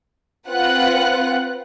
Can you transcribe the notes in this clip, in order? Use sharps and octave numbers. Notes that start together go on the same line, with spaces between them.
C4 F4 B4 F#5 F#6